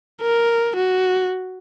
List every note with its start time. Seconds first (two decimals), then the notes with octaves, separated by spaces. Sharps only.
0.22 A#4
0.77 F#4